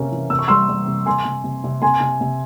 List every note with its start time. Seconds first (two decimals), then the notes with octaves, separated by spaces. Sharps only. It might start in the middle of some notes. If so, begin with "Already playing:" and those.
Already playing: C3 A#3 C#4
0.12 E3
0.30 C3 E6
0.39 C#6
0.48 G3 C6 E6
0.69 G3
0.87 C3
1.06 C3 G#5 C6
1.25 C3
1.44 C3
1.64 C3
1.82 C3 G#5 C6
2.01 C3
2.21 C3